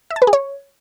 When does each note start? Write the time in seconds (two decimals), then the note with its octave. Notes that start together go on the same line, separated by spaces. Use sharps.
0.10 E5
0.16 A5
0.22 B4
0.27 G#4
0.33 C#5